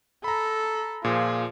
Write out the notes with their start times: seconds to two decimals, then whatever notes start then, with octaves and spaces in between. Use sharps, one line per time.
0.24 A4 A#5 B5
1.04 A#2 F3 G#4